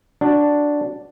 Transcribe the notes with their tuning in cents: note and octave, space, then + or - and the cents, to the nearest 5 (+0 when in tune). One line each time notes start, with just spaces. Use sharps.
D4 +0 F#4 +0